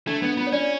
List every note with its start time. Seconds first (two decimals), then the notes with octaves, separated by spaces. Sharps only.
0.07 A3 D4
0.22 B3 D4
0.37 B3 F4
0.47 C#5
0.52 C#4 D5